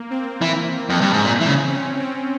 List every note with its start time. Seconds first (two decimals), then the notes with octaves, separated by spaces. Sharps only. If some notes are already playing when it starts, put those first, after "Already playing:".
Already playing: A#3
0.10 C4
0.42 E3
0.89 F2
1.01 G2
1.13 G#2
1.25 A#2
1.41 E3
1.47 C#3
1.68 C#4
1.99 C4